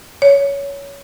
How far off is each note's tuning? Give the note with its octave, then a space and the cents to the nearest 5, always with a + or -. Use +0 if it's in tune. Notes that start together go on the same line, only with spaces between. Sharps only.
C#5 +15